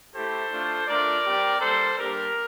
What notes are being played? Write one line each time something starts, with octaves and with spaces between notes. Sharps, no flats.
A3 E4 G4 A4 C5
A3 D4 F4
A3 D4 F4 A#4 D5
G3 C4 G4
G3 A#3 D4 A4 C5
G3 A#3 D4 G4 A#4